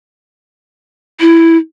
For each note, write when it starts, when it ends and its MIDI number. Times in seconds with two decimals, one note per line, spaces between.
1.20 1.57 64